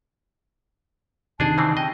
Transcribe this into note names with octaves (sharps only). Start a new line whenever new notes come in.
C3 D#3 D4 G#4 A5
C#3 E3 C4
D#5 G5